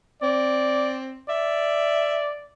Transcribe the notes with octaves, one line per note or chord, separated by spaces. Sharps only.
C4 D5
D5 E5